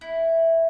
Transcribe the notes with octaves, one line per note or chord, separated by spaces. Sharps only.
E4